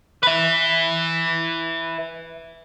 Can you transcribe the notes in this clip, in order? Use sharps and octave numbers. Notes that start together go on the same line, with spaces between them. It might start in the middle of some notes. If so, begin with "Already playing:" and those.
B4 E5